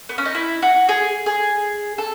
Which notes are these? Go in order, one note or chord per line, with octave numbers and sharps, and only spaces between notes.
B3
C#4
D#4
E4
F#4
G#4
G#4
A4